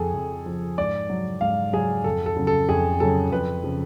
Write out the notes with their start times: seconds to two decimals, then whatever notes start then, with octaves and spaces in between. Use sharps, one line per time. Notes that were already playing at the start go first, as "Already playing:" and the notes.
Already playing: F2 F3 G#4 A4
0.14 F2
0.46 F3
0.78 G#2 D5
1.10 F#3
1.41 G#2 F5
1.73 F#3 G#4
2.04 F2 A4
2.26 A4
2.36 C#3 F#3
2.47 A4
2.69 F2 G#4
3.00 C#3 F#3 A4
3.31 F2 B4
3.64 C#3 F3